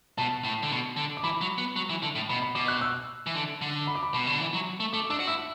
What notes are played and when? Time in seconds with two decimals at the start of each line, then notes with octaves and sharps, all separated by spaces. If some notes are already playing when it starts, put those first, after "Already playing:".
0.18 B2 A5
0.44 A2
0.63 D3
0.71 B2
0.97 D3
1.17 D6
1.24 E3 B5
1.41 F#3
1.58 B3
1.76 F#3
1.90 E3
2.02 D3
2.15 A2
2.29 B2 B5
2.42 B5
2.55 B2 D6
2.68 F#6
2.81 E6
3.26 E3
3.34 D3
3.61 D3
3.87 B5
3.95 D6
4.03 B5
4.14 B2
4.27 D3
4.40 E3
4.54 F#3
4.80 A3
4.93 A3 D6
5.10 D4 E6
5.20 F#4
5.27 E4 E6